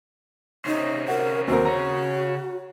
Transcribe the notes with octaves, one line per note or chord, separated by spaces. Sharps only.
C3 C#4 D#4 C5
F#4 A#4
D#2 C4 F#4 A#4
C#3 C#5 A#5